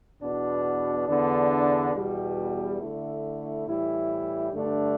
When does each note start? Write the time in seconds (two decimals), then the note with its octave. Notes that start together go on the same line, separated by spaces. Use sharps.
0.21 E2 B2 B3 D4
1.08 E2 D3 B3 D4
1.94 E2 B2 G3
2.80 D3 A3 E4
3.66 A2 E3 G3 E4
4.52 G2 D3 A3 D4